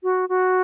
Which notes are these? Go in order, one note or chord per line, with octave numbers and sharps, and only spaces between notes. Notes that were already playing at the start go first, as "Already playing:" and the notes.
F#4
F#4